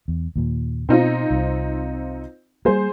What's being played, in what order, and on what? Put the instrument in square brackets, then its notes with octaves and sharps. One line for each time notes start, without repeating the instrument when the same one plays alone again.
[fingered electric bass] E2
D#2 A#2
[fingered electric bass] B2 [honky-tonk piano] C4 D#4 F4
[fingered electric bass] C2
[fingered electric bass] G3 A#3 [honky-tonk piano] G#4 C5